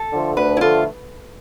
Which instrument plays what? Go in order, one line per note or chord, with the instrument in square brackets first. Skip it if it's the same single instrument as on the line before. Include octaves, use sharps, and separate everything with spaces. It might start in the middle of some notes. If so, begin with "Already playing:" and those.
Already playing: [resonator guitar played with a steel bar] A4
[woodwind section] D3 F3 A3
[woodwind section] D2 [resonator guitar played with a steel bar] B4
[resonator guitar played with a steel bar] E4
[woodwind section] D3 F3 A3 [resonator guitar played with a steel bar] F4